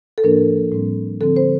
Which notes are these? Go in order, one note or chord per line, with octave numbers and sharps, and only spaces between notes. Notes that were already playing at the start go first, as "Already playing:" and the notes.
A4
A2 F3 A#3 D4 A#4
A2 G3 C4
D3 F3 C4 A4
C5